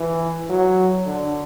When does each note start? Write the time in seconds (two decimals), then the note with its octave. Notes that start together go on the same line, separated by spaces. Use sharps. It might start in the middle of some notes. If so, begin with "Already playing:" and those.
Already playing: E3
0.49 F#3
1.05 D3